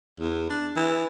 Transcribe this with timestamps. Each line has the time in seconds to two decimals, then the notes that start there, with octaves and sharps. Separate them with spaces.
0.20 E2
0.50 D4
0.76 E3